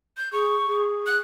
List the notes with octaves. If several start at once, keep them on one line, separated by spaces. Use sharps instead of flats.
G6
G#4 C#6
G#4
F#6